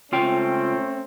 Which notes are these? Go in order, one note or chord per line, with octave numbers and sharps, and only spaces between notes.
C#2 A3 C4 C#4 F4 G5